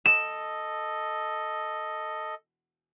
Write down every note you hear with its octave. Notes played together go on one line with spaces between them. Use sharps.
A4 D#5 E7